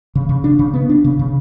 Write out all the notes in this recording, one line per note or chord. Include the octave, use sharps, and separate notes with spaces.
C#3
C#3
D4
C#3
B3
D4
C#3
C#3